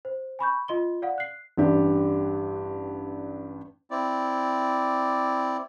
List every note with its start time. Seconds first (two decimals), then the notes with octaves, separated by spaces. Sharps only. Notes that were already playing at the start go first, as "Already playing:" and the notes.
0.05 C5
0.39 G#5 B5 C#6 G6
0.68 F4 D#5 C6 G7
1.02 D5 F5 F#5
1.18 F#6 C7
1.57 A1 G2 D4 G4
3.91 C4 E4 D5